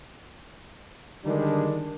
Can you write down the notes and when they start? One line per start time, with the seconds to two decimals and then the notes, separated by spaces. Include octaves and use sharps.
1.25 D3 D#3 G3 G#3 D4